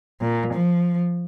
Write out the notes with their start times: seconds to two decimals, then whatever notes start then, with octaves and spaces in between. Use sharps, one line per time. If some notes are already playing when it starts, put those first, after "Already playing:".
0.22 A#2
0.53 F3